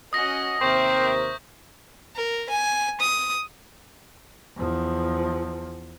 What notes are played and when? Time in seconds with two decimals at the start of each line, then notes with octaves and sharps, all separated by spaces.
0.13 C#4 F#4 D#5 D#6 A#6
0.61 D#2 C3 C4 A#4 C5 E5 C#6 G6
2.15 A#4
2.49 G#5
3.00 D#6
4.57 E2 F3